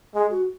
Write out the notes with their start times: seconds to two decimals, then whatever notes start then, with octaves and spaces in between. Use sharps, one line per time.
0.15 G#3 G#4
0.30 F#4